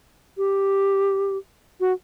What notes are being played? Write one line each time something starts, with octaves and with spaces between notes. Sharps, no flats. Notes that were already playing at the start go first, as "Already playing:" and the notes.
G4
F#4